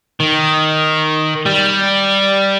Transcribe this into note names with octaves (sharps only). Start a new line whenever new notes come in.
D#3
G3